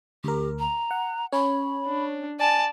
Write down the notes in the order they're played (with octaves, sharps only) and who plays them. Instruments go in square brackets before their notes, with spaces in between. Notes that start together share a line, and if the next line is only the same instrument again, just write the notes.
[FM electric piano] D2 A#4 [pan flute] G4
[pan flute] A#5
[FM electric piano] F#5
[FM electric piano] C#4 C#5 [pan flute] B5
[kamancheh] D4
[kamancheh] D5 A5 [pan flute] G#5